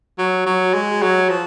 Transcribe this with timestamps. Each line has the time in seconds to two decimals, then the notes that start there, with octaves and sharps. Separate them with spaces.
0.18 F#3
0.46 F#3
0.74 G#3
1.02 F#3
1.29 F3